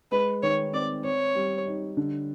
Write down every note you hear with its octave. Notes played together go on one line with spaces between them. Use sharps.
G#3 B4
D#3 C#5
C4 D5
C4 C#5
G3
D#4
D3